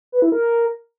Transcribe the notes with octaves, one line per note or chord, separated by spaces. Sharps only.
B4
E4
A#4